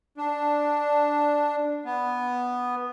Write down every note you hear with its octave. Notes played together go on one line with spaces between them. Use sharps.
D4
B3